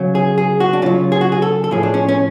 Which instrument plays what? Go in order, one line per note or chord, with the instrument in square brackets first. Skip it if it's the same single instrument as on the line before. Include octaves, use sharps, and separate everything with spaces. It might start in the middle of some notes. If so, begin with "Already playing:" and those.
Already playing: [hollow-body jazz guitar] C#3 F#3
G#4
G#4
F#4
D4
C#3 F#3 F4
G#4
F#4
G#4
A4
A4
A2 F3 G#4
D4
C#4
C#4